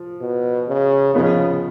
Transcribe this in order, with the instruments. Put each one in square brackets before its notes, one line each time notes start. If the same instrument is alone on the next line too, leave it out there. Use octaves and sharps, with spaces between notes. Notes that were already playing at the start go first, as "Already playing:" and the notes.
Already playing: [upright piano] F3
[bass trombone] B2
C#3
[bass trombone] C#3 [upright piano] F3 B3 D#4